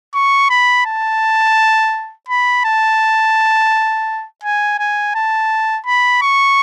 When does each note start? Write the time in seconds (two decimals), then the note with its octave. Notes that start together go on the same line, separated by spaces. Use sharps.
0.14 C#6
0.50 B5
0.86 A5
2.29 B5
2.65 A5
4.44 G#5
4.79 G#5
5.15 A5
5.86 B5
6.22 C#6